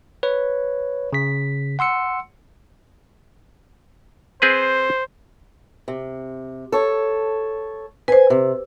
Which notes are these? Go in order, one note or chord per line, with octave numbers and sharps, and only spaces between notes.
B4 C#5
C#3 B6
F#5 C6 E6 C#7
C4 G#4 B4 C5
C3
A4 C#5
B4 C5 G#5
C3